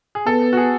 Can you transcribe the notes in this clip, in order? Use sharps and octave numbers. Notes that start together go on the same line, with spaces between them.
G#4
B3 A4
F#4
G#4